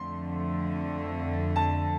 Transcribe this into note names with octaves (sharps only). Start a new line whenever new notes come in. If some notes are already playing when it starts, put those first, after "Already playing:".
Already playing: F2 D3 A3 C6
A5